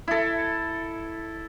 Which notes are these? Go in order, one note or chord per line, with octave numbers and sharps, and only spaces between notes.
E4 A4